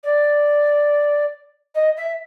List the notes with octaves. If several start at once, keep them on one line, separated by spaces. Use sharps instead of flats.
D5
D#5
E5